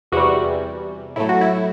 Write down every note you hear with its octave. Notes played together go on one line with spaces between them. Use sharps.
E2 C3 E3 G3 F#4
A2 F#3 A3 E4
F#4
E4